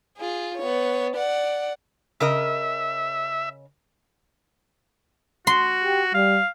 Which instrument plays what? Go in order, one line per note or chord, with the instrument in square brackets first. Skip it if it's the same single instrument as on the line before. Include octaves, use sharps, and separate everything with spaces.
[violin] F4 G#4
B3 C#5
D5 F#5
[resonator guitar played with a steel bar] C#3 A#4 D#5 [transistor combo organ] E5
[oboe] F#4 [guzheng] C6
[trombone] G4
[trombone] G3 [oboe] F5